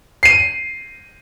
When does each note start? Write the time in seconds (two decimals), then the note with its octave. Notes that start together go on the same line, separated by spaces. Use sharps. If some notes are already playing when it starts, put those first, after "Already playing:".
0.23 C7 D#7